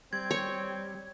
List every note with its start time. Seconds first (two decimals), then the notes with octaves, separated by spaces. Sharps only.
0.13 G3 C4 G#6
0.31 C#5